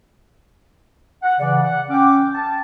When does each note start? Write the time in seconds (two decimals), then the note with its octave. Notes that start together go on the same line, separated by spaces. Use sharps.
1.23 F#5
1.39 C#3 E3 D5
1.63 F#5
1.90 C#4 G5 D6
2.34 A5